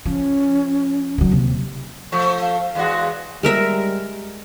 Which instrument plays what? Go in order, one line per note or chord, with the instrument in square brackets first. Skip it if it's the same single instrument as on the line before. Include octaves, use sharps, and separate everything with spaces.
[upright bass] F3 [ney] C#4
[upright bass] D#3 F#3
D#2 C3
[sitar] F3 A3 [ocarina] C#6
[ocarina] F5
[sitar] E2 G#3 F#4
[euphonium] G3 [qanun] G#3 A#4 E5